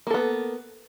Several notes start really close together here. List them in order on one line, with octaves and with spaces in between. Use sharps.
A#3 A4 B3